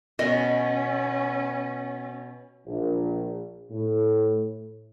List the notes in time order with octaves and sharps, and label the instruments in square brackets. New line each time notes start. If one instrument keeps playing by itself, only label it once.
[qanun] B2 [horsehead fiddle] C#4 [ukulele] D#5
[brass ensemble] A#1
A2